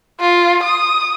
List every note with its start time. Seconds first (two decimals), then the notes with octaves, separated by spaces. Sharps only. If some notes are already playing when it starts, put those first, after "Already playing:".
0.21 F4
0.64 D#6